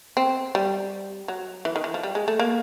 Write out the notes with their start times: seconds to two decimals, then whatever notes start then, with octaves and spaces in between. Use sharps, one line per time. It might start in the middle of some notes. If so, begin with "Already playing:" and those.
0.17 C4
0.55 G3
1.28 F#3
1.65 E3
1.76 D#3
1.84 E3
1.94 F3
2.03 G3
2.15 G#3
2.28 A3
2.39 A#3